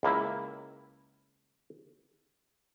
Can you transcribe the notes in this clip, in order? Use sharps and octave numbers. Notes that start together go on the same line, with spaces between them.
C#2 A#3 E4